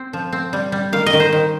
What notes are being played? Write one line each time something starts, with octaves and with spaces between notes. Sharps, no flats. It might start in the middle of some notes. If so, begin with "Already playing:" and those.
Already playing: C4
F3
C4
G3
G3
D#3 F5
D#5
D#3
C5
D#3